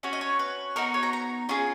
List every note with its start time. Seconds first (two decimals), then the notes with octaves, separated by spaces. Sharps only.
0.03 C#4 F#4 C#5
0.13 D#5
0.21 C#5
0.39 B4
0.76 B3 D#4 F#4 A#4
0.94 C#5
1.03 A#5
1.13 A#5
1.49 C#4 F4 G#4